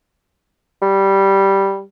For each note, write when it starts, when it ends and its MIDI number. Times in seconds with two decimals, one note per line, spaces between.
0.82 1.82 55